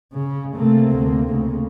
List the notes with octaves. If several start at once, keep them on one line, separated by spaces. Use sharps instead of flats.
C#3
C3 A3 A#3 C4
D2
D2 C#3